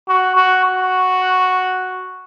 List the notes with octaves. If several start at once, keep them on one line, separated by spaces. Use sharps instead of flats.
F#4
F#4
F#4